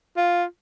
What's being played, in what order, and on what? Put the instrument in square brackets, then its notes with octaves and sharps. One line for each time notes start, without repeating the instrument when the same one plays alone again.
[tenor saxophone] F4